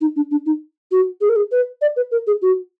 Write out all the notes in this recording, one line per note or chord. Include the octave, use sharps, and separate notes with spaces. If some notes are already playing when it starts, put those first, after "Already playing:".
D#4
D4
D4
D#4
F#4
G#4
A#4
G#4
B4
D5
B4
A#4
G#4
F#4